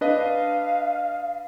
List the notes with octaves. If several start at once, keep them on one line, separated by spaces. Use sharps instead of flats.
D4 B4 D#5 F5